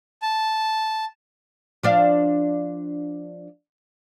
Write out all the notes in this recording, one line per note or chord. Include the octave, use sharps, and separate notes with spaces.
A5
F3 D4 F5